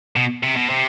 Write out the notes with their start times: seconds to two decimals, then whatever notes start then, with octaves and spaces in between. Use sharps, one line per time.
0.16 B2
0.43 C3
0.56 B2
0.69 C3